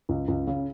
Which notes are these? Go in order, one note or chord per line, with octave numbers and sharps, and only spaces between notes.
C#2
C#2
C#3